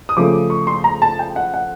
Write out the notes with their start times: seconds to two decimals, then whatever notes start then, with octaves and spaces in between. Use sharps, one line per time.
0.09 D#6
0.17 C#3 F3 A3 D6
0.50 C#6
0.67 C6
0.84 A#5
1.02 A5
1.19 G5
1.36 F#5
1.54 F#5